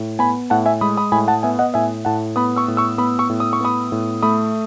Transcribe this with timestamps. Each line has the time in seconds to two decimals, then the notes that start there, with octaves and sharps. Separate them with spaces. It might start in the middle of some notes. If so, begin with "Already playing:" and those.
Already playing: A2
0.19 B3 G#5 B5
0.50 A2 F#5 A5
0.66 E5 G#5
0.81 G#3 B5 D#6
0.97 B5 D#6
1.12 A2 G#5 B5
1.28 F#5 A5
1.43 B3 E5 G#5
1.59 D#5 F#5
1.74 A2 E5 G#5
2.05 A2 F#5 A5
2.36 B3 B5 D#6
2.56 C#6 E6
2.68 A2
2.77 C#6 E6
2.98 B3 B5 D#6
3.19 C#6 E6
3.29 A2
3.40 D#6
3.53 C#6
3.61 B3 B5 D#6
3.92 A2
4.23 A3 B5 D#6